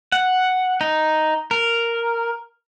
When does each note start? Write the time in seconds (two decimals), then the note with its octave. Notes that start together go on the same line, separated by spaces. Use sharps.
0.12 F#5
0.81 D#4
1.51 A#4